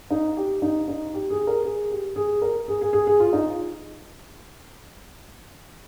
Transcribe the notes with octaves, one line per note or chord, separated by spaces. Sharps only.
D#4
G4
D#4
D#4
G4
G#4
A#4
G#4
G4
G#4
A#4
G#4
G#4
G#4
G#4
F4
D#4